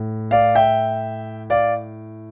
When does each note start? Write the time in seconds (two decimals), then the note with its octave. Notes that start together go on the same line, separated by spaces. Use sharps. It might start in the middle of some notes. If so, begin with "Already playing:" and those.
Already playing: A2
0.31 D5 F5
0.55 E5 G5
1.50 D5 F5